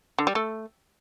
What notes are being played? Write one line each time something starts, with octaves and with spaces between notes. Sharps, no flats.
D3
G3
A3